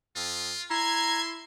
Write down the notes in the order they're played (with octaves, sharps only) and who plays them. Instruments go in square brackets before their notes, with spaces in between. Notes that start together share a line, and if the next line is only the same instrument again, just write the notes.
[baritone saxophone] F2 [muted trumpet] F4
[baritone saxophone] E4 [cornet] A#5 [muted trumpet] C6 [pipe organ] G#6